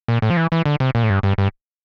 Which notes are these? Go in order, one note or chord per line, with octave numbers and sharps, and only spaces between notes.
A#2
A2
F3
E3
E3
D3
C3
A#2
A2
G2
G2
G2